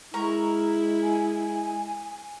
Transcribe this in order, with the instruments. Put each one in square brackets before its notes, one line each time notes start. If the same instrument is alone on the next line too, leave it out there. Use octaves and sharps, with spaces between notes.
[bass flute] G#3 [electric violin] E4 [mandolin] A#4 A#5 C#6
[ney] G#5